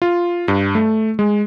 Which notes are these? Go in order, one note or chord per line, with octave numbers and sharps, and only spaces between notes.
F4
G2
A3
G#3